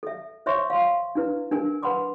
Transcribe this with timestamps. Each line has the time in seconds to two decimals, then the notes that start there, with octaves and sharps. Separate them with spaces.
0.03 A4 E5
0.46 C5 C#5 E5 C6 C#6
0.70 F5 C6
1.15 D4 E4 B4
1.52 D4 A#4 G#5
1.83 B4 F#5 B5 C6 D6